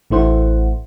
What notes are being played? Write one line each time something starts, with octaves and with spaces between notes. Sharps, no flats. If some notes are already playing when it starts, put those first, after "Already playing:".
A1 A3 E4 C5 F#5